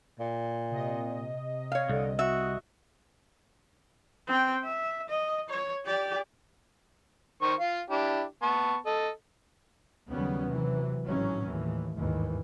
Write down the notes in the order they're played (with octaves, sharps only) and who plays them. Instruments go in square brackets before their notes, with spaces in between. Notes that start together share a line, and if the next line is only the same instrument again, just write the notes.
[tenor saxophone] A#2
[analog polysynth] C3 D#5
[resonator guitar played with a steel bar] C#5 F5
[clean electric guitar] C2 [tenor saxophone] D3
[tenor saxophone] F#4 [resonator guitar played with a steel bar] E5
[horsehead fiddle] C4 G5
E5
D#5
C#5
G4 D5
[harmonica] D#3 C5 C#6
F4 F5
D4 E4 G4
B3 A5 C#6
A4 D#5
[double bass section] D#2 C#3 F#3 G3 B3 C#4
C3 E3 F#3
G#1 A2 D#3 E3 F#3 C#4
D#2 A2 E3
G1 D#2 G#2 E3